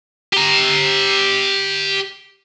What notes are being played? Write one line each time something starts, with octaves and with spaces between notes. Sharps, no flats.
G4 A#5